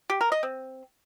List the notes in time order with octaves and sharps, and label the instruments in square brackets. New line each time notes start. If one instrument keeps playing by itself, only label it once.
[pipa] G4
A#4
D#5
C4